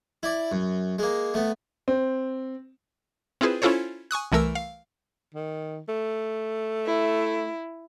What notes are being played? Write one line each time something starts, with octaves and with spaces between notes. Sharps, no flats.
E4 D5
F#2
G#3 A#3
A3 B3
C4
C4 E4 F4 G#4 B4 C5
C#4 E4 F4 A4 C5 C#5
G#5 C#6 D#6 F#6
C2 E3 A3 A#4 E6
F5
D#3
A3
E4